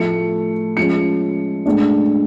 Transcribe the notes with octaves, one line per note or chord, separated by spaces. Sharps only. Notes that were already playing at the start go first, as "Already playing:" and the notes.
Already playing: A2 F3 A3 C#7
F3 G#3 C#4 C#7
A2 G#3 D4